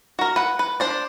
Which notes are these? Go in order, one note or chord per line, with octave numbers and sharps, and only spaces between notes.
F#4 A#4
B4 F#5
B4
D4 C5 D5